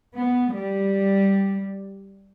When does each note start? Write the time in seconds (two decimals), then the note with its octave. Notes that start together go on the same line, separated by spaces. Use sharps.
0.16 B3
0.55 G3